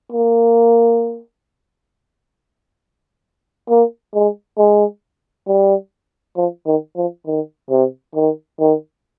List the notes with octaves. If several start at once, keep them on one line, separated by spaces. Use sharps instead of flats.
A#3
A#3
G#3
G#3
G3
F3
D#3
F3
D#3
C3
D#3
D#3